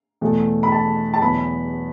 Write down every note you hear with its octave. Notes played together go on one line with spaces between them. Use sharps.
E2 B2 A3
B5
A5
A5
E2 B2 F#3 B3 B5